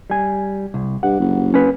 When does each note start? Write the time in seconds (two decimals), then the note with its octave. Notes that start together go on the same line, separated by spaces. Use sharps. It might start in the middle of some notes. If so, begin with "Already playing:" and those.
0.10 G3 G#5
0.74 C2
1.03 G2 F#5
1.20 F#1
1.54 C#4 B4